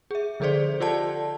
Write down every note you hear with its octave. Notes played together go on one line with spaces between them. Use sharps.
G#4 E5
D3 F3 G#4 A4 C5 D5
F4 G4 A4 D5 F#5 A5